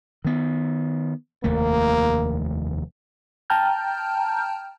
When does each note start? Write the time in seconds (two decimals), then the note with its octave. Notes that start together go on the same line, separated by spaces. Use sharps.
0.25 D#3 B3
1.44 F1 D#2 A3 A#3
3.50 G5 A5 A#5 F6 G6